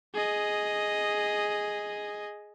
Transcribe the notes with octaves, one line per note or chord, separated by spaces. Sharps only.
G#4 D#5